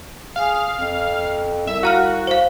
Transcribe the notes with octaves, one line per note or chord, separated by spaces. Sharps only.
G#4 F5
F2
C2 E5
F#4 F5 A#5 F6
C5 F5